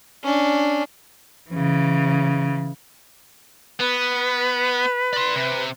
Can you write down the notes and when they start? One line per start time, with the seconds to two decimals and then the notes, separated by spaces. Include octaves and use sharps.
0.24 C#4 D4
1.51 C#3 E3
3.80 B3 B4
5.13 D5 C6
5.36 C3